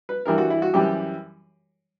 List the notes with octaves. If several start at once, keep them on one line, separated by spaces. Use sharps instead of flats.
B4
G2 E3 G3 A#4
F#4
E4
F#4
F#2 E3 G3 G4